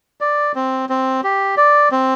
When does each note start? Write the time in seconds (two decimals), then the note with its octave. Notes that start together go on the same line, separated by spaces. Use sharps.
0.21 D5
0.55 C4
0.89 C4
1.24 G4
1.57 D5
1.91 C4